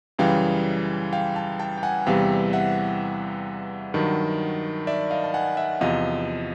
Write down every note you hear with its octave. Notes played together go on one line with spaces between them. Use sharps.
F#2 C#3 E3 G3 F5 G5
F5 G5
G5 A5
G5 A5
G5
F#5 G#5
E2 C3 E3 G3 F5 G5
E5 F#5
G2 D#3 F#3
D5 E5
D#5 F5
A5
F#5 G#5
E5 F#5
E2 C3 F3 D#5 F5